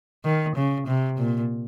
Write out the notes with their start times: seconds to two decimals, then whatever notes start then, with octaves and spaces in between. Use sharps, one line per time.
0.25 D#3
0.56 C#3
0.88 C3
1.18 A#2